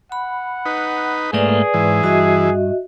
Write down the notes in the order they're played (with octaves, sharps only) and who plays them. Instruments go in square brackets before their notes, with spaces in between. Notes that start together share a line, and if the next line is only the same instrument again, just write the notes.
[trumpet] F#5 [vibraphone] B5
[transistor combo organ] D#4 B4
[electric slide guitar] G#2 A3 A#3 [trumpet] G#4 [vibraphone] B4 D5 G#5
[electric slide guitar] G#2 [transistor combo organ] E3
[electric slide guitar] G2 [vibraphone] F#4 D#5 E5